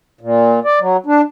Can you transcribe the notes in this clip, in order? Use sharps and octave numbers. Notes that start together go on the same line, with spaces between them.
A#2
D5
F#3
D4